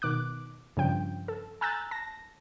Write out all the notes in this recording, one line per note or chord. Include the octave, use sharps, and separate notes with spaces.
B2 D#3 D6 F#6
G2 C#3 F3 G5
A4
G#5 A#5 E6 F#6 G6 A6
A5 A#6